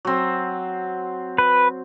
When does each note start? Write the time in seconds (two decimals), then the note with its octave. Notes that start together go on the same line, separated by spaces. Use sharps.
0.05 F#3 C4
1.38 B4